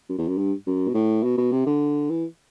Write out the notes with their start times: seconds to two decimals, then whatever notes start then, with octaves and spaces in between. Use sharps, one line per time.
0.09 F#2
0.18 E2
0.28 F#2
0.38 G2
0.67 F#2
0.88 B2
0.94 A2
1.23 B2
1.37 B2
1.52 C3
1.66 D3
2.09 E3